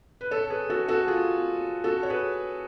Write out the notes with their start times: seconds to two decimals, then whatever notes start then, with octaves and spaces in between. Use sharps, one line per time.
0.21 B4
0.31 A4 C#5
0.50 G#4 B4
0.70 F#4 A4
0.88 F#4 A4
1.08 F4 G#4
1.84 F#4 A4
2.03 C#5
2.10 G#4 B4